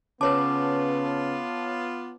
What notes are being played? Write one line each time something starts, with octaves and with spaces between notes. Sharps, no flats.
C#3 B3 F4 B4 C#5 A5 D6